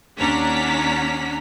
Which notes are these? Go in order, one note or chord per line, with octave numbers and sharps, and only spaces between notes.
D#2 C#4 D4 F#5 A#5 B6